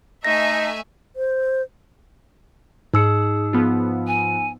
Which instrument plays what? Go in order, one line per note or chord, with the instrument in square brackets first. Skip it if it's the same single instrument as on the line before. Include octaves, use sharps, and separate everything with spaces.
[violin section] A3 E5 G#5 [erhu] D#4 [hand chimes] A#6
[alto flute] C5
[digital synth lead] G#2 [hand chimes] D#4 E6 C#7 [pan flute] G#4
[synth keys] F3 B3 F4
[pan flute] G#5